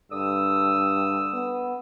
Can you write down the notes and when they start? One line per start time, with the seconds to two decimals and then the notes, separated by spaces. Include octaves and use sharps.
0.12 G2 D3 D#6 E6
1.34 B3